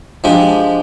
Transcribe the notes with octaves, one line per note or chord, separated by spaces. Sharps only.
F3 G#3 D4 G4